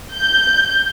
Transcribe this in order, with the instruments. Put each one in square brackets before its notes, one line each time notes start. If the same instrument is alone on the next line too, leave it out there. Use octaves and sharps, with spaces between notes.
[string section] G6